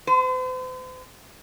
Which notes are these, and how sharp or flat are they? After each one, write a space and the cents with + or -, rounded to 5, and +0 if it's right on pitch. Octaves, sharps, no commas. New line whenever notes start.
C5 -45